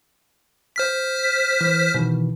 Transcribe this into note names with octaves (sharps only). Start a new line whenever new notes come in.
C5 F6 B6
E3
B2 D#3 E3